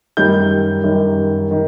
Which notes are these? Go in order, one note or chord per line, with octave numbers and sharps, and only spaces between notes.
F#2 D#3 G3 G6
F#2 D#3 G3
D#3